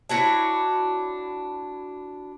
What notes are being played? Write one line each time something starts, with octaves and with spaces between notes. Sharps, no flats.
D4 E4 F#4 C#5